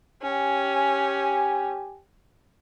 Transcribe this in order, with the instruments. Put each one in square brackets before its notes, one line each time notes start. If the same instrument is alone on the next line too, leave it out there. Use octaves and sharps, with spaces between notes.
[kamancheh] C#4 [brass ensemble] G4 G5 G#5